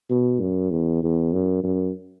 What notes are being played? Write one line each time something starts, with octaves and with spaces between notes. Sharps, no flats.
B2
F#2
E2
E2
F#2
F#2